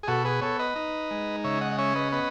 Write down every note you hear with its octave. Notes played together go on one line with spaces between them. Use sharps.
G#4
B2 F#4 A4
G#4 B4
B3 A4 C#5
B4 D#5
D#4
G#3
C#3 C#5 E5
D#5 F#5
D#5
C#4 C#5 E5
B4 D#5
B3 B4 D#5